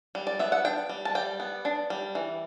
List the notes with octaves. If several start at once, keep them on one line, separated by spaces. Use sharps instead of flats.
G3
D5
B3 E5
F#5
D4 G5
G3
A5
G3 G5
B3
D4
G3
E3